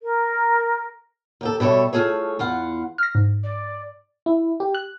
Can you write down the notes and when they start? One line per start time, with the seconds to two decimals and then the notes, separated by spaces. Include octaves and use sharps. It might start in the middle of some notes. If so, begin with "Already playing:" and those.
0.01 A#4
1.41 D#2 G4 A4
1.60 B2 G3 A4 C#5 E5
1.93 A3 F4 G#4 A4 C#5
2.39 E2 F4 F#5
2.98 F6 A#6
3.15 G#2
3.43 D5
4.26 E4
4.60 G4
4.75 F#6